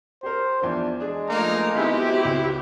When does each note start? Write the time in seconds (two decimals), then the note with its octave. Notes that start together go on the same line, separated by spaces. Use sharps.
0.23 G4 A#4 C5
0.62 E2 F3 D4
1.00 G#3 D4 G#4
1.29 F3 A3 A#3 D#4 A#5
1.75 D#3 B3 C4 E4 F#4 G4
2.25 C#2